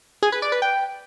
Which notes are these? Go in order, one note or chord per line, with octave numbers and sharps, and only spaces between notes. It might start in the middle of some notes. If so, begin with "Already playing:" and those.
G#4
B4
D5
B4
G5